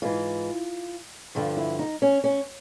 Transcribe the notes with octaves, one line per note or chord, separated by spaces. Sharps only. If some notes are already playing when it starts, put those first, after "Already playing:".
G#2 E3 F4
G2 D3 F3 F4
E4
D#4
C#4
C#4